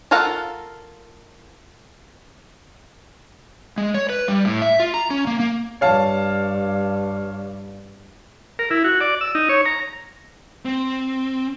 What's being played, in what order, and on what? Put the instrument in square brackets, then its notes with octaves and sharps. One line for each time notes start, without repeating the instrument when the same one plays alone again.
[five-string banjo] F4 A4 A#4 F5 F#5
[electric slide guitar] G#3
C#5
B4
G3
A2
E5
F4
A#5
C#4
A#3
A#3
[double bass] G2 [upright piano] C#5 F5 A5
[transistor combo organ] A#4
E4
F#4
D5
E6
D#4
C#5
A#5
[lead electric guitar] C4